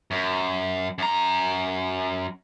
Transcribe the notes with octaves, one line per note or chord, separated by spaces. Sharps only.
F#2
F#2 A#5